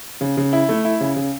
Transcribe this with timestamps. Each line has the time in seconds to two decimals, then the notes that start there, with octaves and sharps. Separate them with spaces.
0.21 C#3
0.37 C#3
0.53 E4
0.69 A3
0.85 E4
1.01 C#3
1.16 C#3